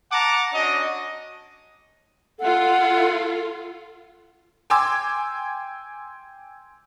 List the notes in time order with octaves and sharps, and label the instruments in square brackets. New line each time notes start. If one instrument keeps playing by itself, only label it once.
[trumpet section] F#5 A5 A#5 D6
C#4 D4 F#4 D#5
[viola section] F4 A4 [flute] F#5
[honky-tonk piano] G5 G#5 C6 D6 E6 G#6